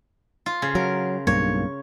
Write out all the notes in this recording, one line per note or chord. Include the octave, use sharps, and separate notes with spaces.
F4
C#3
F#3 A#4
B1 G2 A#3 C#5